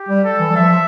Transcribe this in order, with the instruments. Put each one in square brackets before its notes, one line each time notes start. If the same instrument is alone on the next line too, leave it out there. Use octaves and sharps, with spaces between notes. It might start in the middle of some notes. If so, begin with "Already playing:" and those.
Already playing: [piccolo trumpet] G4
[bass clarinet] G3
[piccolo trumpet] A4
[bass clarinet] E3
G3
[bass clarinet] F3 [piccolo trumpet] E5
[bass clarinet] F3